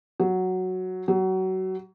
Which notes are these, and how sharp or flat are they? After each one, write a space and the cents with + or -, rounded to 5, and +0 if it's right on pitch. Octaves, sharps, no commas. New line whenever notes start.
F#3 +0
F#3 +25